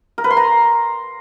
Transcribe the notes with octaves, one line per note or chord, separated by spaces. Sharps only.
A#4
B4
C6
A#5